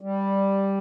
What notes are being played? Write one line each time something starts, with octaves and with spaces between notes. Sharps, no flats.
G3